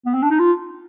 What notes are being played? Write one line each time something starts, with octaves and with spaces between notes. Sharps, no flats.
B3
C4
D4
D#4
F4